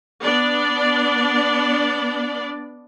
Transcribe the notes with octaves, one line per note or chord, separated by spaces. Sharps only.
B3 D4 D5